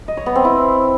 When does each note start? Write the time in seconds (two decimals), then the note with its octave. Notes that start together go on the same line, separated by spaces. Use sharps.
0.08 D#5
0.17 C#5
0.26 B3
0.35 C4
0.45 E4